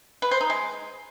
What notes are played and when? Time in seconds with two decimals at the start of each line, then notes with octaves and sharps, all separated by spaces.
0.22 B4
0.31 C5
0.41 D#4
0.50 G#3